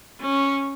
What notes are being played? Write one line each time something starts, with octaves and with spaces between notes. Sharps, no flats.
C#4